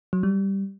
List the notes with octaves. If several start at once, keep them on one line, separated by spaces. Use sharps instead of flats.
F#3
G3